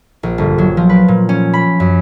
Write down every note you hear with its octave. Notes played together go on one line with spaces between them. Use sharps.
A#1
G1
F#3
F3
B4
A#2
C#4
B5
F#2